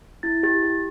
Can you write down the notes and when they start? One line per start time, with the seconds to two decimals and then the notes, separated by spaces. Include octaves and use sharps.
0.23 E4 A6
0.43 G4 A6
0.63 G4